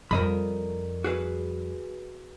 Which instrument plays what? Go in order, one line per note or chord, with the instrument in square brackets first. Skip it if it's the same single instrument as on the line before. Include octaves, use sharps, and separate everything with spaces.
[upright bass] F2 G3 [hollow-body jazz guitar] A#4 D#5 B5
[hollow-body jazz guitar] F#4 G#4 B4